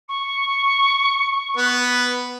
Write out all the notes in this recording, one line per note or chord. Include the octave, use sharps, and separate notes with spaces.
C#6
B3 B4